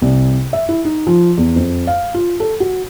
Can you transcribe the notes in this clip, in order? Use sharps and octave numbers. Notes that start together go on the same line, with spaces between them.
C2
E5
E4
D#4
F3
E2
F2
F5
F4
A4
F#4